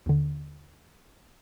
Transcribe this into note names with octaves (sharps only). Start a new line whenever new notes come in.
D#2 D3